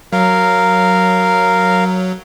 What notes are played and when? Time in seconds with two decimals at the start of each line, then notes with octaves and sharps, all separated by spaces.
0.13 F#3 A#4 F5